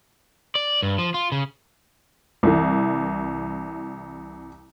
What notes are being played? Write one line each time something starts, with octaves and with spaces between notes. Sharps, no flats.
D5
G2
F3
F4
C#3
C2 E3